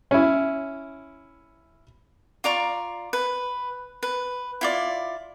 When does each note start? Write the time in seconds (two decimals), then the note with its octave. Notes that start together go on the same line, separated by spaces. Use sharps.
0.11 C#4 E4
2.44 F4 D5 A#5 C#6
3.13 B4
4.03 B4
4.61 E4 F4 D5